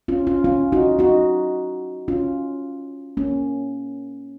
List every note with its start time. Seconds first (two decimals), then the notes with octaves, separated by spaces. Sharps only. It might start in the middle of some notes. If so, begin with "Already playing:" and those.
0.08 C#4 F4
0.27 C#4 F4
0.44 C#4 F4
0.72 D#4 F#4
0.99 D#4 F#4
2.08 C#4 F4
3.17 A#3 C#4